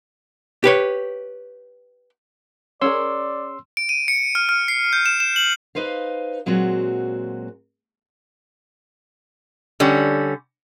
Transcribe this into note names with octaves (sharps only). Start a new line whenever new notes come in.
G4 B4 C#5
C#4 G#4 A#4 D5 C6 E6
D7
D#7
C#7
F6
F6
C7
G6
E7
E7
F#7
D#4 B4 C5 F5
A#2 F#3 G#3 C4 F#4
D3 G3 C#4